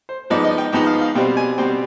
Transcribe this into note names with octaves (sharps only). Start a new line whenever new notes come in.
C5
G#2 F3 B3 D#4 D5
D#5
G5
G#2 F3 B3 D#4 G5
F5
F5
B2 G3 C4 G5
G#5
B2 G3 C4 G5